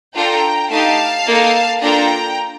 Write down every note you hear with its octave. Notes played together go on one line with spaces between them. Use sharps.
D4 F4 A4 G5 A#5
A3 D#4 G4 F5 A5
A#3 D#4 A4
A#3 D4 F4 A4 G5 A#5